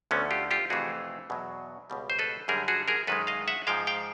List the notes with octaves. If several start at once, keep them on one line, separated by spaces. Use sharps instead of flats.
D2 D3 F3 A3 B3 C#4
F4 G4
F4 G4
F2 C3 E3 A3 F#4 G#4
E2 B2 F#3
C#2 B2 G3
C5
A4 B4
F#2 D3 G3 G#4 A#4
F#4 G#4
G#4 A#4
F#2 D#3 G#3 A4 B4
D#5 F5
E5 F#5
G#2 F3 G#3 F5 G5
F5 G5